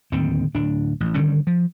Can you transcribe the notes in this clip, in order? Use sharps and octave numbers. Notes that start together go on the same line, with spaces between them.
D1 D#2 D3 C4
D1 D4
A1
D3 D#3 G3 C#4
F3